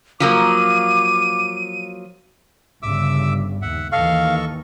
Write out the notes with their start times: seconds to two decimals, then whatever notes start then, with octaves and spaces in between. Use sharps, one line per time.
0.20 F3 F#3 A#3 D6 D#7
2.83 G1 G2 C#3 E5 D6 E6
3.62 D#2 E5 F#5
3.92 D#2 D#3 E3 A4 D#5 F5 C#6